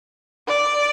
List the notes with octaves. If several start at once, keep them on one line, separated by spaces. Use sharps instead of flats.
D5